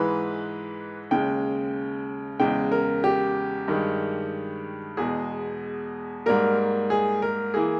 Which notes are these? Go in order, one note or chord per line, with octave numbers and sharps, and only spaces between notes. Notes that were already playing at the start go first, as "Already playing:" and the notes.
Already playing: G#2 E3 G#3 B4
D#2 C#3 G#3 G5
E2 C#3 G#3 G5
A#4
G4
G2 D#3 G#3
E2 B2 G#3 G#4
G#2 G3 A#3 A#4
G#4
A#4
E3 A#3 G#4